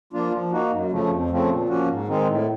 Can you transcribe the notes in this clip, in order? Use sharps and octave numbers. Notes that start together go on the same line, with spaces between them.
F3 A#3 D4 F4
F3
A#3 D#4 F#4
F#2
C#3 F3 A3
F2
C#3 F3 A3 C4
A#2
F3 A#3 C#4 F#4
G#2
D#3 G#3 C4 D#4
A2